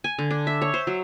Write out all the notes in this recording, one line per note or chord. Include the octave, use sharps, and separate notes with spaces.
G#5
D3
D4
E5
C#5
C5
F#3